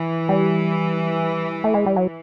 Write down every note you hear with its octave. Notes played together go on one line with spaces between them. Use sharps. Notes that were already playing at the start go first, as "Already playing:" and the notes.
Already playing: E3
G3
A3
G#3
G3
F#3